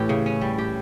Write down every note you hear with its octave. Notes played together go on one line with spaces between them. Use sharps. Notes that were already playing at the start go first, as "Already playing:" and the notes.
Already playing: A2 E3 G4
C#3
C#4
G3
G4